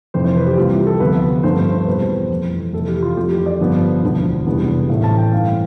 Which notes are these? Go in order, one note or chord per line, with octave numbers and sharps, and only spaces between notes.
F1 F2 E3 C5
C5
B4
G4
C2 C3 E3 G3 F4
G4
A4
D2 C3 F3 B3 B4
G2 F3 A3 C4 C5
C5
C5
E2 B2 G3 C4 B4
C5
F2 E3 A3
F2 C3 E3 A4
G4
F4
F2 E3 A3 G4
G4
D5
G1 G2 F3 B3
E1 D2 D3 F3
F1 E2 D3 G3 B3
A1 A2 E3 A3 C4
A5
G5
G2 E3 A3 C4 F5